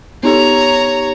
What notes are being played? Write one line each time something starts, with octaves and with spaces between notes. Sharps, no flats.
B3 D#4 G4 C#5 A#5